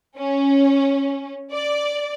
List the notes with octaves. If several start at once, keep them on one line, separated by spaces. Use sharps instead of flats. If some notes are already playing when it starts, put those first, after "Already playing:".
C#4
D5